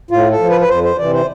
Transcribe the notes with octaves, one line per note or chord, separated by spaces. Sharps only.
A2 F4
A4
F3
B4
B4
F2 C5
C5
C3 E3 D5
C5